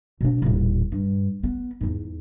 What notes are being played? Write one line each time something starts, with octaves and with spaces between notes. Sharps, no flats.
B2 D4
D#1 A1
G2
B3
E2 G#2